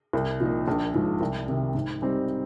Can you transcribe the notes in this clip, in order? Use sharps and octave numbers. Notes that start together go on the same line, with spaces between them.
C2
A#2 F3 A#3 D#4
A#1
G#2 F3 G#3
C2
C3 D#3
G#2
G3 C4 D#4